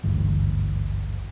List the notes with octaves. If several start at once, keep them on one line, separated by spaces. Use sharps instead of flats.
G#1 D2 G2 E3